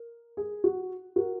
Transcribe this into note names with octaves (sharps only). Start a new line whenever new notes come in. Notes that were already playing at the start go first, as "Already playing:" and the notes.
Already playing: A#4
G#4
F#4
F#4 A#4